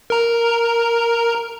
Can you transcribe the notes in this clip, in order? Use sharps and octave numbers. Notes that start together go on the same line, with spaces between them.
A#4 A#5